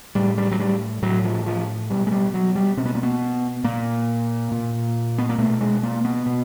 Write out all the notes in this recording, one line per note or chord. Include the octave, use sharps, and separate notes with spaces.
A2 G3
G3
F#3
G3
A2 F#3
F3
F3
B2 G3
G#3
G3
F#3
G3
B2 C4
B3
A#3
B3
A#2 A#3
A#2
B3
A#3
B2 A3
G#3
A#3
B3
B2